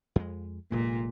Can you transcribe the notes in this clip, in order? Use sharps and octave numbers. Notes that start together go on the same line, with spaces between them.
F2 G#3
F1 A#2 G#3